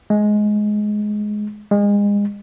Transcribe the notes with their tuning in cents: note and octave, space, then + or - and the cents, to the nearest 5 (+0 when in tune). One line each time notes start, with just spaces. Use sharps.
G#3 +15
G#3 -30